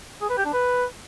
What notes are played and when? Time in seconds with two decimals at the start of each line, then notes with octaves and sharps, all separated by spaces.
0.22 G#4
0.29 B4
0.37 G4
0.45 D4
0.53 B4